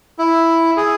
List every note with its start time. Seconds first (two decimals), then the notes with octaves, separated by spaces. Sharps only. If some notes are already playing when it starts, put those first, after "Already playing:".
0.19 E4
0.77 G#4